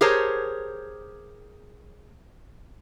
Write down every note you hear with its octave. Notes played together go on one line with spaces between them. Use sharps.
G4 G#4 A#4 C5 C#5 A5